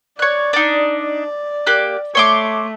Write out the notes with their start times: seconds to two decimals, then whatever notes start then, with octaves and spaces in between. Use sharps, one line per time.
0.19 C#5 D5 F#6
0.53 D4 D#4
0.99 D5
1.67 A#3 G4 F#6
2.15 A3 C#5 C6 D6